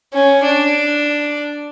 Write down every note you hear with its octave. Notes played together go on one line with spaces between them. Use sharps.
C#4
D4